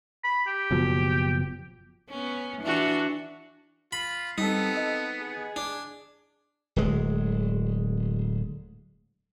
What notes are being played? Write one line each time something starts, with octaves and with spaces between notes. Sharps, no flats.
B5
G4
F#1 B2 F3
B3 C#4
E3 D4 F#4
F4 B5
G3 B3 C4 D#4 A4 B6
D#5
G#4
D4
D1 G#3